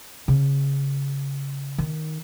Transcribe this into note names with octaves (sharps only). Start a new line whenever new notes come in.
C#3
D#3